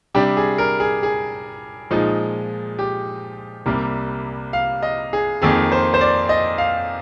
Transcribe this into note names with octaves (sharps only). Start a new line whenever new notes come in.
C3 G3 D4 G4
G#4
A#4
G#4
G#4
A#2 F3 G#3 D#4
G4
C2 C3 G3 A#3
F5
D#5
G#4
F2 D#3 A#3 G#4
C5
C5
D5
D#5
F5